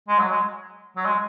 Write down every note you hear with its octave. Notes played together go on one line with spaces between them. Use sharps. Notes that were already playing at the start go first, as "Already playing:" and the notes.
G#3
F#3
G#3
F#3
G#3